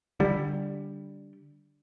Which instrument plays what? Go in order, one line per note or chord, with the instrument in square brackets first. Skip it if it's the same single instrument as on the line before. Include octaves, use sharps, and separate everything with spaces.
[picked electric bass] D3 G3